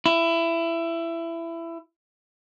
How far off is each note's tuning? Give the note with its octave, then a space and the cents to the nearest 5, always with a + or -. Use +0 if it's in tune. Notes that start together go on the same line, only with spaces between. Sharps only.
E4 +20